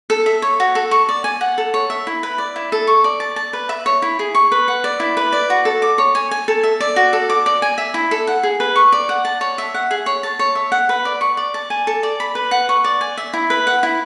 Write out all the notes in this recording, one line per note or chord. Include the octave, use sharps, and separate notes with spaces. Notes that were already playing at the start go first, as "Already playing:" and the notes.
A4
E5
C#5
F#4
A4
C#6
D5
G#5
F#5
A4
C#5
E5
E4
B4
D5
E4
A4
C#6
D5
A5
A5
B4
E5
C#5
E4
G#4
C#6
B4
F#5
D5
E4
B4
D5
F#4
A4
D6
C#5
G#5
G#5
A4
E5
D5
F#4
A4
D6
D5
G#5
E5
E4
A4
F#5
G#4
B4
C#6
D5
F#5
A5
C#5
E5
F#5
G#4
C#5
A5
C#5
E5
F#5
B4
D5
C#6
D5
A5
G#5
A4
D5
B5
B4
F#5
C#6
D5
G#5
E5
E4
B4
F#5
E4